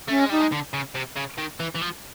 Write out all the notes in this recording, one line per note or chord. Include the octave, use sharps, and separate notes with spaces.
A3 C#4
G#3
G3 D#4
G#3
D3
C#3
C3
C#3
D#3
E3
E3
F3